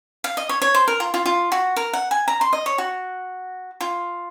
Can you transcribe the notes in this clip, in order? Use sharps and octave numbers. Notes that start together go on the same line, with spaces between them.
F5
D#5
C#5
C#5
C5
A#4
F4
F4
F4
F#4
A#4
F#5
G#5
A#5
C6
D#5
C#5
F#4
F4